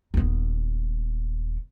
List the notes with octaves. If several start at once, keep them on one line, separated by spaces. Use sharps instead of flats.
D#1 B3